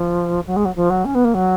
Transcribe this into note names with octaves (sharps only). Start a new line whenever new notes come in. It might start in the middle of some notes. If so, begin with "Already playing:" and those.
Already playing: F3
F#3
G#3
F#3
F3
F#3
C#4
B3
A#3
F#3